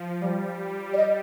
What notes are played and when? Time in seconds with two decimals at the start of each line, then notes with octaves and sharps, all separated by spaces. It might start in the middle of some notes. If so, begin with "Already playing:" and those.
Already playing: F3
0.21 G3
0.93 D5
0.97 D#5